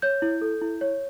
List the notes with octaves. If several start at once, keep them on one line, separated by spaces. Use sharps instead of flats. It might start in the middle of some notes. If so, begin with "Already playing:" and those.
C#5 G6
E4
A4
E4
C#5